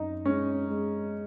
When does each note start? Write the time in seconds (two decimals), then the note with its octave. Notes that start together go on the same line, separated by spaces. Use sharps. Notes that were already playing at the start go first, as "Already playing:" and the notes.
Already playing: F#2 D#4
0.25 G#3 C#4
0.70 G#3